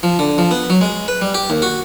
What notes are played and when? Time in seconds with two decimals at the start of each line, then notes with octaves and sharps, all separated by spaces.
0.03 F3
0.19 D3
0.38 F3
0.51 B3
0.70 F#3
0.81 G#3
1.08 B4
1.22 G3
1.35 G4
1.50 D#2
1.62 F#4